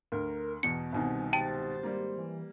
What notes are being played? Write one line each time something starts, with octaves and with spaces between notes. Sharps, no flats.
D2 A#4
E2 B2 B3 C#7
C2 B2 D#3 G3 C4 G#5
G#1 G4 C5 G5 A5 A6
G3 A#3
E3